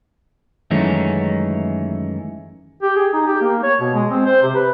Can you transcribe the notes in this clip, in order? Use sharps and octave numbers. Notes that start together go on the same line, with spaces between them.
F#2 D#3 E3 G#3 A3 C#4
G4
G#4
D#4
G4
A#3
C#5
B2
G#3
C4
C5
C3
B4